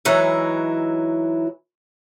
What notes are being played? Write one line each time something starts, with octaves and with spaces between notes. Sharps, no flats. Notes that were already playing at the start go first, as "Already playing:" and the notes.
E3 F#3 G#3 D#4 E4